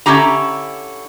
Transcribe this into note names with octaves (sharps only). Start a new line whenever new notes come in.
D3 C#4 E4 G4 A#5